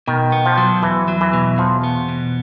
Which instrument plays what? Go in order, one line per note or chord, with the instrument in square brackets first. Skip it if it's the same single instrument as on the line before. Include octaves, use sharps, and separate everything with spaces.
[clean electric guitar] B2 [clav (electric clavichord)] D#3
[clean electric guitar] B3
[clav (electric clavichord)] F3
[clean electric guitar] F#3
[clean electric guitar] E2 [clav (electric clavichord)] E3
[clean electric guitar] F#3
[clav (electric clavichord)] E3
[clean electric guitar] B2
[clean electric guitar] E2 [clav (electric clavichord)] F3
[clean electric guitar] B3
B2